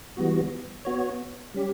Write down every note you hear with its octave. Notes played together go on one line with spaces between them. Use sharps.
E3 G3 B3 F#4
B3 F#4 C#5
G3 C#4 G4